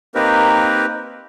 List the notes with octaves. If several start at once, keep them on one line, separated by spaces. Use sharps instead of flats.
A#3 C4 D#4 G4 A#4 B4